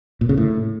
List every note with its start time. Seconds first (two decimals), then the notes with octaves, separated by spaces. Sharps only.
0.21 A#2
0.29 C#3
0.37 A2